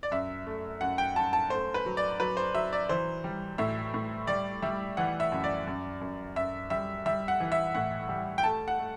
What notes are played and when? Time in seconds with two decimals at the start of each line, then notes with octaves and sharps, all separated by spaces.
0.03 D5
0.11 F#2 E5
0.47 A3
0.81 F#2 F#5
0.98 G5
1.16 F#2 A5
1.33 A5
1.50 A3 C5
1.74 B4
1.86 F#3
1.97 D5
2.20 F#3 B4
2.37 C5
2.55 F#3 E5
2.73 D5
2.89 E3 C5
3.24 G3
3.58 A2 E5
3.94 A2
4.27 G3 D5
4.62 G3 E5
4.97 E3 F#5
5.20 E5
5.32 F#2
5.44 D5
5.67 F#2
6.01 F#2
6.36 F#2 E5
6.70 G3 E5
7.06 G3 E5
7.28 F#5
7.40 E3
7.52 E5
7.75 A2 F#5
8.09 G3
8.38 G5
8.44 A3 A5
8.68 F#5
8.79 A3